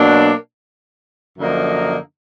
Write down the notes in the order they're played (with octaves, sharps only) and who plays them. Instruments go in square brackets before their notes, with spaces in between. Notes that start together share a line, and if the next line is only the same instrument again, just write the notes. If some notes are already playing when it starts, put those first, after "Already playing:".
Already playing: [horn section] B2 F#3 A#3 D4
F#2 D3 F3 A#3 D#4